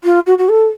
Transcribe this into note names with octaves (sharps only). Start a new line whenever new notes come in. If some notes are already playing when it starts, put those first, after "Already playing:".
F4
F#4
F#4
A4